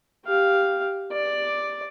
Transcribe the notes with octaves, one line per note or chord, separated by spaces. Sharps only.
G4 F5
D5